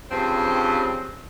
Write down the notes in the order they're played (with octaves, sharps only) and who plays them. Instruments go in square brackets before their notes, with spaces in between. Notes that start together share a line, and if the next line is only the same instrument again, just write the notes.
[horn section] G2 C#3 F3 C4